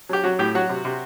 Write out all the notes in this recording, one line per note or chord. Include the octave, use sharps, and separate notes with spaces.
F#3 G4
F#3 F#4
A2 G4
F#3 F#4
C3
C3